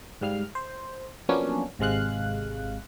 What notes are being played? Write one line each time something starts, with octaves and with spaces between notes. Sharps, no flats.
G#2 G3 F5 F6
C5
F3 F#3 A#3 B3 C#4 D4
G#1 C3 G#3 F5 F#6